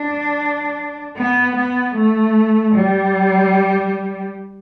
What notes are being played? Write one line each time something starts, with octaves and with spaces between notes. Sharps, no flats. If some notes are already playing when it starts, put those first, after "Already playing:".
Already playing: D4
B3
B3
A3
G3